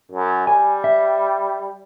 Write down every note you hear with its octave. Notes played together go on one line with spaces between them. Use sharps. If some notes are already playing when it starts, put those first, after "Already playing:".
F#2
G3 G#5
E5